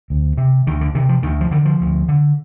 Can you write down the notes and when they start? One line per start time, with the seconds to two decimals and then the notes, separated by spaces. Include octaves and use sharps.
0.10 D2
0.37 C3
0.67 D2 D#3
0.81 D3
0.95 C3 D#3
1.09 F3
1.23 D2 D#3
1.41 F3
1.51 D3 D#3
1.65 F3
1.81 D2
2.08 D3